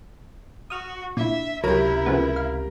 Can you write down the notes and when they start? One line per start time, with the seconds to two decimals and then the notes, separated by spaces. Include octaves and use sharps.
0.70 F#4 D#6 F6
1.17 A#2 C#4 D4 E4 E5
1.64 C#2 C3 F#3 E4 G4 A#4
2.06 C#3 F3 B3
2.36 F5